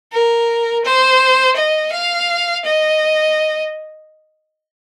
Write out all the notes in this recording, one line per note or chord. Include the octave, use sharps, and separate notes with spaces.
A#4
C5
D#5
F5
D#5